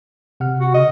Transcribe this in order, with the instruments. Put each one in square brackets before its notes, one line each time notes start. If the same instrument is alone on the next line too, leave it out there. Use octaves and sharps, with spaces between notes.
[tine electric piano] C3 F#5 F6
[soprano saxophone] F#4
[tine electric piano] C#3 [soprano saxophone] D#5